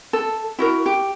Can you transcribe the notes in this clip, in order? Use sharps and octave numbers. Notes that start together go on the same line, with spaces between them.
A4
E4 F#4 A#4
G4